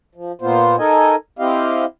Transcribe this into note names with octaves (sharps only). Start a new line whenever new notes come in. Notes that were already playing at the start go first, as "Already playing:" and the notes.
F3
A#2 A#3 B3 F4 C5
D#4 A4 A#4 D#5 G#5
C4 E4 G4 D#5 F5